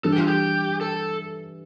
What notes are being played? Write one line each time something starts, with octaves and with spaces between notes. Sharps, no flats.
E3 G3 D4 A4
G4
F4
G4
A4